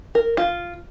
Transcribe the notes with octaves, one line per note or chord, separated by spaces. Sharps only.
A#4
F4